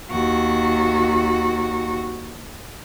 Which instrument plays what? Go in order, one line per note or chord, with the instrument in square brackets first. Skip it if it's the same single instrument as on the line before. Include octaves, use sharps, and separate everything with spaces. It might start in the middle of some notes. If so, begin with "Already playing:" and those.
[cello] D#2 F#4